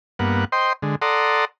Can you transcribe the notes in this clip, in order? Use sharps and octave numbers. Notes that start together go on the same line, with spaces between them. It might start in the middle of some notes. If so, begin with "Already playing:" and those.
G2 A#3 B3 F#5
C5 D#5 G5 C6
D3 G#3
A4 D5 F#5 A#5 C6 D#6